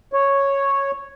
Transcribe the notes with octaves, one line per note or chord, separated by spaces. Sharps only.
C#5